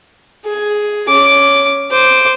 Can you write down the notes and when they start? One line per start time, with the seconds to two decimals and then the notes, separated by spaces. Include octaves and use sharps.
0.46 G#4
1.08 C#4 D6
1.91 C5 D6